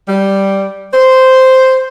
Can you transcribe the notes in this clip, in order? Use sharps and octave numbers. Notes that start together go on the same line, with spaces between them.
G3
C5